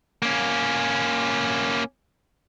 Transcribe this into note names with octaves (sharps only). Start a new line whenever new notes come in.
A#3 C#4